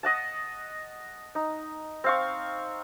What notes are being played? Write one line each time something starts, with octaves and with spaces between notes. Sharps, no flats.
D#5 F#5 A5
D#4
C4 F5 C#6